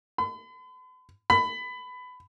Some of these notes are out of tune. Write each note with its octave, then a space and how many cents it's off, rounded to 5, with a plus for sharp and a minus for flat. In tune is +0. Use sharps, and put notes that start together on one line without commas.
B5 +45
B5 +20